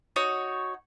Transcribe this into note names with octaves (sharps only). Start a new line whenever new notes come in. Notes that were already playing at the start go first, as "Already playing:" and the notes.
D#4 F#4 C#5